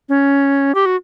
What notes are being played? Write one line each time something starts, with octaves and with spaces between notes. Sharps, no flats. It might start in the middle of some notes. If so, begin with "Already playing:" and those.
C#4
G4
F#4